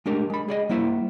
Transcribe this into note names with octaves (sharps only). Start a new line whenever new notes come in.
G#3 A3 D4 G4 A#4
G#3 B5
G#4 D5 D#5
G3 A#3 E4 C5 E5